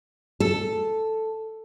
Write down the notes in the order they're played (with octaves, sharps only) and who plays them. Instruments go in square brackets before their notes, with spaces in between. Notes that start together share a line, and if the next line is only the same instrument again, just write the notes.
[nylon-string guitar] A4